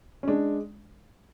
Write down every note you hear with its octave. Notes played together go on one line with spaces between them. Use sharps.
C#4
G#3 D4